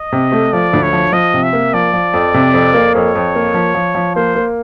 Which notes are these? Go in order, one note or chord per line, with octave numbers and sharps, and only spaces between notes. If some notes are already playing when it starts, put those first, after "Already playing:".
Already playing: D#5
C3
A3
F3 D5
D2
C#5
F3
F3 D#5
C3
E5
A#3
F3 D5
F3
F2
C3
F2
A#3
F2 C#5
F2
A#3
F3
F3
F3
A#3 C5
A#3